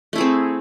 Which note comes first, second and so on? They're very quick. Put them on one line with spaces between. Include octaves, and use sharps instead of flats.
A3 E4 G#4 C4